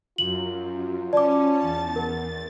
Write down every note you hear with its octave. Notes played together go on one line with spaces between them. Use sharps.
F#2 F4 F#7
C#4 D5 A5 D6
E2 A6
B3 A#4